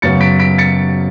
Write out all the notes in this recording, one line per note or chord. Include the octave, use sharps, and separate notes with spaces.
F#2 C#3 F#3 B3 A6 C#7
B6 D7
B6 D7
A6 C#7